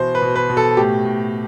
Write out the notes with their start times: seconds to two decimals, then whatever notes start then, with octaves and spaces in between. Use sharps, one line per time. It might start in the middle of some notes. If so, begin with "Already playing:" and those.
Already playing: B2 E3 C5
0.15 B4
0.22 B2
0.35 B4
0.49 B2
0.57 A4
0.77 A2 G4
1.05 A2